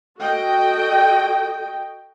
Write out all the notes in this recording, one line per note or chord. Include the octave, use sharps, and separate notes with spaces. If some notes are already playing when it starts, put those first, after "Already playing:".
F#4 A4 D#5 G5